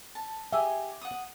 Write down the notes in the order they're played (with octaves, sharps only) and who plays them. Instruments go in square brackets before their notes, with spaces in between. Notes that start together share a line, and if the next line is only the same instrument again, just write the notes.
[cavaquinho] A5
[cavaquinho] G4 G#4 G#5 [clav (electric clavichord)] E5
[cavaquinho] F#5 D#6